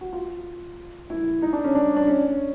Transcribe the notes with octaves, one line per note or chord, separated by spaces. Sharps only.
F#4
F4
E4
D#4
D4
C#4
D4
D4
C#4